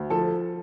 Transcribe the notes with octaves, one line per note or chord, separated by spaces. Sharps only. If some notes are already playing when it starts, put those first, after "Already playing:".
Already playing: D2
F3 A4 A5